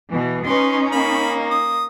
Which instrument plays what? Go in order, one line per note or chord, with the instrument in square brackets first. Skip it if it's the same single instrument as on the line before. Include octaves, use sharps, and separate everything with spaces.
[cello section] B2 E3
[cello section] C#4 D#4 [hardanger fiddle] B4 C6
[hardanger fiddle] A#3 [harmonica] B5
[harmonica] D#6